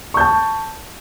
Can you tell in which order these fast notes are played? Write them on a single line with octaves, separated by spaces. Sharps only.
C#6 G6 A5